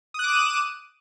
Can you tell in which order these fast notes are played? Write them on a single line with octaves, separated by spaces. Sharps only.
D#6 F#6 D6 E7 D#7